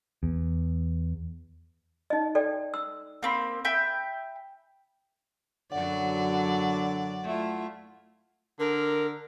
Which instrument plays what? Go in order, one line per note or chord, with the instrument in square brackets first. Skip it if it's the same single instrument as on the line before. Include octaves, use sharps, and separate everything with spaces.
[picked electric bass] E2
[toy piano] D#4 D#5
A4 D5 G5
E6
[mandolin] A#3 C4 B5
E5 G5 B5
[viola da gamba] F#2 F#3 [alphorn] D3 [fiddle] D5 [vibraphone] F#5
[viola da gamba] A3 E4 F4
[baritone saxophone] D3 [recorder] A#4